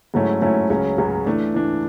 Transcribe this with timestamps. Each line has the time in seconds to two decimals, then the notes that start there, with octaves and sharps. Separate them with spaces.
0.14 G#2 F#3 A3 C#4 E4
0.42 G#2 F#3 A3 C#4 E4
0.69 C#2 C#3 F#3 C#4
0.98 C#2 C#3 F#3 C#4
1.26 E3 A3 D4
1.54 E3 A3 D4